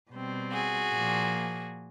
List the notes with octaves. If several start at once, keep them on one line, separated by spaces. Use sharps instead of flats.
B2 G3 C4
F#4 G#4
A#2 F3 A#3